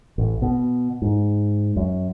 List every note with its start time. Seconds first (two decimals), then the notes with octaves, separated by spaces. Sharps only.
0.18 A1
0.42 B2
1.02 G#2
1.76 F#2